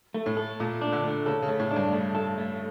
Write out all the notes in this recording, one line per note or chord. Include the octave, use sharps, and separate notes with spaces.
A3
A2
A4
A#2 A3
D4
D3
A3
C#3 A4
C#3
A3
A2
D4
G2
A3
A4
A3